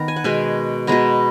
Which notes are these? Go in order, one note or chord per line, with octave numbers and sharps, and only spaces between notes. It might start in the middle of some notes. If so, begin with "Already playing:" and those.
Already playing: D#3 B3 A#5
G#5
F#5
B2 G#3 B3 G#5
B2 G#3 B3 A#5